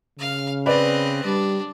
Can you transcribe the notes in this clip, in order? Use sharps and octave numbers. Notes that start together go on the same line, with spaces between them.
C#3 F5 F6
C4 B4 D5 D#5
G3 D4